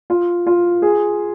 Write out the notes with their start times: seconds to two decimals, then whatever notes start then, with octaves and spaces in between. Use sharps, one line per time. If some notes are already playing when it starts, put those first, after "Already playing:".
0.10 F4
0.47 F4
0.82 G#4